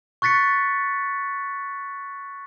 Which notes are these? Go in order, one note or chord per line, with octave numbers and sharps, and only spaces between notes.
C#6 F#6 A6 B6 C#7